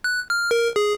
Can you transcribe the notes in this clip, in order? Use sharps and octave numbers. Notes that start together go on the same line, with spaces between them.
F#6
F6
A#4
G#4